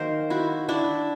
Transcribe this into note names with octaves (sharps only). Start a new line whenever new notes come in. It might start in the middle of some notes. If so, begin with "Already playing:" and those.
Already playing: D#3 F#3 A#3 A#4 C5
E4 F#4
D4 E4